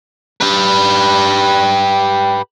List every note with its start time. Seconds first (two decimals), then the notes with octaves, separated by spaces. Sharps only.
0.41 G4 B4